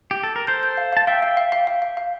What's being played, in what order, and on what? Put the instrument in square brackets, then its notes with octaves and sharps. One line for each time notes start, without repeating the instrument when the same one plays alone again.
[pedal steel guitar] G4
A4
A#4
[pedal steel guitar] A4 C5 [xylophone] G6
[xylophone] G6
F5
[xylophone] F5 [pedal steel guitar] A5
[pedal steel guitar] E5 G5 [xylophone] F5
[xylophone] F5
F5
F5
F5
F5
F5